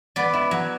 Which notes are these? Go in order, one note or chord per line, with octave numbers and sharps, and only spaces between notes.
B3 D5
E4
F#3